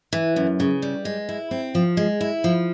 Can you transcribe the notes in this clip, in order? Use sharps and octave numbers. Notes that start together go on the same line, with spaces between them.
E3
F#2
C#3
G3
G#3
E4
C4
F3
G#3
E4
F3